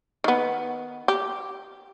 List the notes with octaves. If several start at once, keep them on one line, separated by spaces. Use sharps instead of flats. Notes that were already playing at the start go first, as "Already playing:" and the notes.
D#3 B3
G4